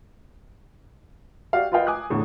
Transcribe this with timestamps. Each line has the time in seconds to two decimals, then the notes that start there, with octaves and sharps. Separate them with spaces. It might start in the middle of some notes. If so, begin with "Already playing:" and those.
1.53 F#4 G4 D5 F5
1.72 F4 A#4 B4 D#5 F5 G5
1.87 G#5 D6 D#6 F#6
2.10 E2 A2 D3